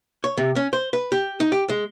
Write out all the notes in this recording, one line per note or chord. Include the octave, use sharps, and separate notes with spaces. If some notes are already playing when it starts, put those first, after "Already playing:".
C#5
C3
C#4
C5
B4
G4
D#4
G4
G#3